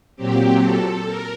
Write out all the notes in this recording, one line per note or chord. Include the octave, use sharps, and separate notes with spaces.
A#2 F#3 C4 G4
A4
A#4